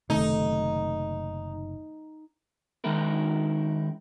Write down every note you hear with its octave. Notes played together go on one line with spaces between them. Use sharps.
F#1 C3 D#3 A3 D#4 A4
D#3 G#3 C#4 D#4 E4 A#4